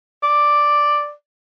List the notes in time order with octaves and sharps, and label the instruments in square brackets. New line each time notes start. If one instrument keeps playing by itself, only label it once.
[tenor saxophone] D5